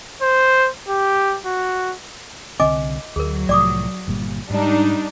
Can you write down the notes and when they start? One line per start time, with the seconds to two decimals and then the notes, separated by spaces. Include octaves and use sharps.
0.22 C5
0.89 G4
1.46 F#4
2.60 C2 D3 C4 D#5 G#5 D6
3.16 D2 F#3 G#4 A#4
3.49 C2 A2 F3 D5 D6 D#6
4.08 G1 A#2 G3
4.50 G#2 G3 D4 D#4